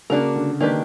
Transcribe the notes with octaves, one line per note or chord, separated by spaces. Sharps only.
C#3 A#3 D4 F#4 A#4
D3
D#3 A#3 D4 G4 B4